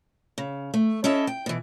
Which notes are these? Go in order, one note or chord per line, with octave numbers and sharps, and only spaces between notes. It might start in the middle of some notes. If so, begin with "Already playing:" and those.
C#3
A3
C#4 E4 A4 D#5 E5
G5
B2 E3